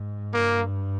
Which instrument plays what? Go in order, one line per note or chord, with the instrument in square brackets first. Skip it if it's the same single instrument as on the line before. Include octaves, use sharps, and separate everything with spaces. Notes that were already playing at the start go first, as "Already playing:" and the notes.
Already playing: [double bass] G#2
[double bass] G2 [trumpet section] A#3